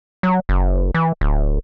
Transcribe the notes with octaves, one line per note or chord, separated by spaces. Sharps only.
F#3
F#1
E3
D1